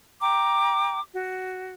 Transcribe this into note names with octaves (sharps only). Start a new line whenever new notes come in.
G5 A#5 D6
F#4